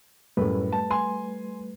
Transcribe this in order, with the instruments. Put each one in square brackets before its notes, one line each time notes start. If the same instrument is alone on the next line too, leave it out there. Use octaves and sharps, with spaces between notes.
[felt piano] F#2 A2 [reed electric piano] G3 A3 B4
[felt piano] A5
G#5 C6